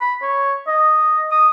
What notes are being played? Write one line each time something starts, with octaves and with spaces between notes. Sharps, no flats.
B5
C#5
D#5
D#6